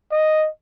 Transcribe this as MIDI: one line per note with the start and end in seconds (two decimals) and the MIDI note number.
0.12 0.48 75